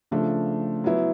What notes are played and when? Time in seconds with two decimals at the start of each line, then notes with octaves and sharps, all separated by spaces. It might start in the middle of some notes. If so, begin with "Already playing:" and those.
0.11 C#3 F3 A3 D4
0.84 F#3 B3 E4